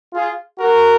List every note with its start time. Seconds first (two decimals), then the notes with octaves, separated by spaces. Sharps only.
0.13 F4 G#4
0.59 F#4 A#4